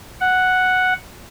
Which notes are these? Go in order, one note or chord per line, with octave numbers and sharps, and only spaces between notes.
F#5